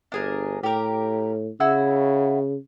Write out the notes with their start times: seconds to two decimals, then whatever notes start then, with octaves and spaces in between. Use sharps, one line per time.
0.12 G1 D4 G#4 A#4
0.63 A2 G4 A#4
1.60 C#3 E4 F#4 E6